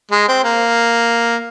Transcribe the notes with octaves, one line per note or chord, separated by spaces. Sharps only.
G#3
C4
A#3